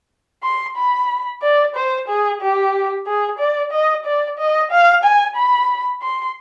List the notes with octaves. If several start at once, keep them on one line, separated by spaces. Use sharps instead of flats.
C6
B5
D5
C5
G#4
G4
G#4
D5
D#5
D5
D#5
F5
G#5
B5
C6